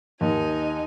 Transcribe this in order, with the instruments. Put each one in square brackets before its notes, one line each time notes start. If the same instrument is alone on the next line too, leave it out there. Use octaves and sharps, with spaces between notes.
[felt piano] D#2 [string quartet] D#4 G#5